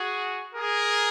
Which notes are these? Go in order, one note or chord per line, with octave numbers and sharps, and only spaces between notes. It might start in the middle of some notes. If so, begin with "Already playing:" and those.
Already playing: F#4 G#4
G#4 A#4